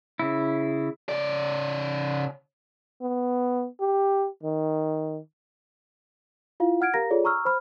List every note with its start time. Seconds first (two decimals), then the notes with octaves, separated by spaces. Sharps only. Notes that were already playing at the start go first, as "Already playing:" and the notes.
0.19 C#3 E4
1.09 C#3 D5
3.02 B3
3.80 G4
4.43 D#3
6.60 E4 F4 F5
6.81 F#5 F6 G#6 D7
6.94 G4 A#4 F5 A#5 A#6
7.10 F4 G#4 A4 C#5 D5
7.24 A#5 C#6 E6 F6
7.45 C5 B5 F6